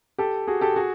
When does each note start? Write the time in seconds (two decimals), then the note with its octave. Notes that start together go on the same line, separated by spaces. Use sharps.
0.18 G4 A4
0.48 F#4 G#4
0.61 G4 A4
0.76 F#4 G#4